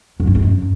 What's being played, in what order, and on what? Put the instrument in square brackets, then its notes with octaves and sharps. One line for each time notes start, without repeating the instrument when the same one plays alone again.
[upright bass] F#2
F3
G#3
F#2